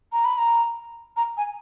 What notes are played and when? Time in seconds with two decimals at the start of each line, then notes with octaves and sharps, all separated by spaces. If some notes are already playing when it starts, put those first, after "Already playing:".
0.12 A#5
0.25 B5
0.38 A#5
1.17 A#5
1.37 G#5